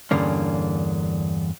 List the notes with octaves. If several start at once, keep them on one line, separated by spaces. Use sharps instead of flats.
E2 G2 D3 A#3 C#4